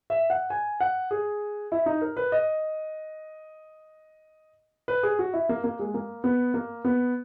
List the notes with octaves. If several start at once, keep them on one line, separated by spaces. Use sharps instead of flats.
E5
F#5
G#5
F#5
G#4
E4
D#4
A#4
B4
D#5
B4
G#4
F#4
E4
A#3
A#3
G#3
A#3
B3
A#3
B3